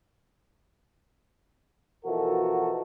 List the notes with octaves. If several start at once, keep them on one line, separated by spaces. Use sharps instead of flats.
B2 E3 F3 F#4 A4 A#4